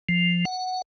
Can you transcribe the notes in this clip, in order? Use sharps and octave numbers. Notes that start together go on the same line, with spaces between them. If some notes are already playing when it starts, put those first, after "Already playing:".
F3
F#5